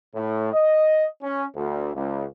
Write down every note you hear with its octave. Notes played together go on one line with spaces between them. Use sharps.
A2
D#5
C#4
D2
C#2